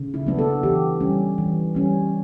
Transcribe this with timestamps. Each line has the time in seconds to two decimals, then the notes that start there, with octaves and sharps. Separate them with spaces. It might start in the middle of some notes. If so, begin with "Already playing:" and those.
Already playing: C#3
0.14 E4
0.26 F#3 B3 D4
0.39 A4
0.63 E3 G4
1.00 G3 C#4
1.38 E3
1.75 G3 C#4